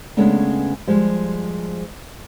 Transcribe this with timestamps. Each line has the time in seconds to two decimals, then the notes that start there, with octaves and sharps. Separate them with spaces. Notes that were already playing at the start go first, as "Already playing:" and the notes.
0.17 C#3 G#3 A3 B3 C#4 D4
0.87 F3 G3 G#3